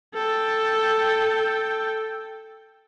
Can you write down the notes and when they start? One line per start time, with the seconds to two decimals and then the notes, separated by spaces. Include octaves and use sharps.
0.14 A4 G5